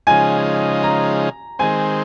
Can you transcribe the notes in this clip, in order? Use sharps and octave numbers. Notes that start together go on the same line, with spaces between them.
C#3 F3 G#3 D#4 G#5
A#5
D#3 G#3 C4 G#5